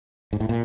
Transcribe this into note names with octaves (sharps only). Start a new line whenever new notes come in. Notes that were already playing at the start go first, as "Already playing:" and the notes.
G#2
A2
A#2